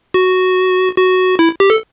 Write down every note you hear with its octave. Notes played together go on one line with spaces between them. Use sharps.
F#4
F#4
E4
G4
A4